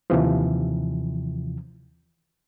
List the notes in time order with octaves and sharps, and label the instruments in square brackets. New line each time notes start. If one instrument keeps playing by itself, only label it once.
[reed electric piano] D#2 C3 E3 F3